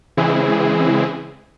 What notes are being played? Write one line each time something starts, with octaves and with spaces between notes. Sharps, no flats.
C#3 E3 G#3 C4 E4 G#4